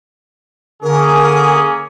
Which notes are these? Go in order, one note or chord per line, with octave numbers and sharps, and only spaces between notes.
D3 A#3 C#4 G#4 A#4